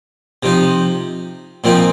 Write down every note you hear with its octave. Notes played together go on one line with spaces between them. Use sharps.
C3 F3 D#4
A#2 F3 C4 D#4